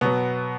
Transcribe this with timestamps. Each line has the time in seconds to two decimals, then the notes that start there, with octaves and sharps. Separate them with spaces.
0.01 B2 F#3 B3